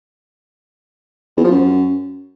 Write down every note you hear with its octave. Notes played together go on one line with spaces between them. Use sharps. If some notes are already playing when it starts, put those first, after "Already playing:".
E2
F3
F#2